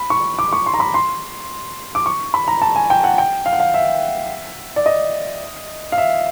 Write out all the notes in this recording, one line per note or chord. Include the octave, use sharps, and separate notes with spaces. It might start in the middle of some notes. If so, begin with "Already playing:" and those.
Already playing: B5
C#6
D6
C#6
C6
A#5
B5
C6
D6
C#6
B5
A#5
A5
G#5
G5
F#5
G5
F5
F#5
F5
E5
D5
D#5
F5
E5